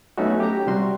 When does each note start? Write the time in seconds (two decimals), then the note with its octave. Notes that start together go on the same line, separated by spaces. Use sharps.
0.18 F#3 A3 B3 C#4 D#4 F#4
0.40 G4 C#5 A#5
0.67 C3 G3 F#4 C6